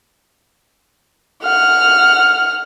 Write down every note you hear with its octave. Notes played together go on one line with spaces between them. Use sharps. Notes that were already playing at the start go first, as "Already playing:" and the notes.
F#5 F6